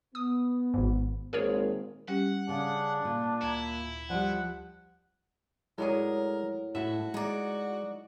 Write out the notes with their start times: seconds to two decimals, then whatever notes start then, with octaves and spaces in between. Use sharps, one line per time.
0.15 B3 D#6
0.74 G#1 G#2
1.33 G#1 A#2 G#4 A#4 C#5
2.08 G3 C#4 G4 F#5
2.49 C#3 D4
3.04 A#2
3.42 D2 E4 A#5 G#6
4.10 F3 G3 D5 F#5
5.78 A2 F#3 G#3 G#4 A#4 D5
6.75 A2 F#4 E5
7.14 G#3 D#4 D5